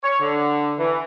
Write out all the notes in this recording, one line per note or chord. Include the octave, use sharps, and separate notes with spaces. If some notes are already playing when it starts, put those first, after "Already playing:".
C#5
D3
E3